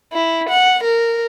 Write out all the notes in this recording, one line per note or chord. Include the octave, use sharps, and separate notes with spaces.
E4
F#5
A#4